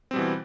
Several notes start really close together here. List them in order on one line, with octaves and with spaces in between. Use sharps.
C4 G3 B2 E3